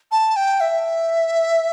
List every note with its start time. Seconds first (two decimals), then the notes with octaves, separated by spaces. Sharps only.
0.12 A5
0.36 G5
0.60 E5